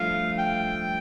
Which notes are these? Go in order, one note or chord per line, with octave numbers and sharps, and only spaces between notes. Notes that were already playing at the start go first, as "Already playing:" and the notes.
Already playing: G2 F3 A3 F5
G5